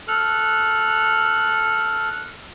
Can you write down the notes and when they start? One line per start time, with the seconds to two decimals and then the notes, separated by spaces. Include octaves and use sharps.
0.08 A4 F6 F#6